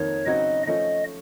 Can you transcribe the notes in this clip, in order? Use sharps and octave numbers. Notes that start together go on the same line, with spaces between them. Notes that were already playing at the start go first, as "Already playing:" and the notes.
Already playing: F2 D#3 A#3 D#4 C#5
C#3 F#3 C4 D#4 F#4 D#5
F3 A3 C#4 D#5